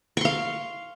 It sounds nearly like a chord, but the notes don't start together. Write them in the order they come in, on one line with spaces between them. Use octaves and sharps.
C#6 C6 F5